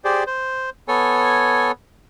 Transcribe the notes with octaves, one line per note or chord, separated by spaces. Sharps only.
G4 G#4 C5 D5
C5
B3 A4 C#5 G#5